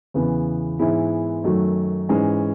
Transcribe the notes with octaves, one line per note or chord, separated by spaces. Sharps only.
E2 C#3 E3 B3
G#2 E3 B3 E4 G#4
F#2 D#3 F#3 A3
G#2 E3 G#3 C#4